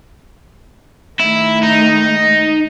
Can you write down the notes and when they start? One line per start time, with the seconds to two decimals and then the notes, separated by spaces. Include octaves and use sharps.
1.19 D#3 A3 E4
1.63 D#4